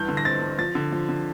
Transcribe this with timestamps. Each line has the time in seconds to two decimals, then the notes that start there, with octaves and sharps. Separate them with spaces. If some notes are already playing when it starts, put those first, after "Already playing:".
Already playing: G2 E3 G6
0.08 D3
0.17 A#6
0.25 C4 A6
0.42 G2
0.58 F3 A6
0.75 D3
0.92 F3
1.09 D3